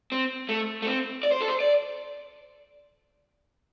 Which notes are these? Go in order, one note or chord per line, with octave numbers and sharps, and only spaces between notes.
C4
A3
A3
C4
D5
C5
A4
C5
D5